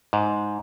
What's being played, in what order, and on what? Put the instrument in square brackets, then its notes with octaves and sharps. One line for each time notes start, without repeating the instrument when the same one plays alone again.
[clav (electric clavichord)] G#2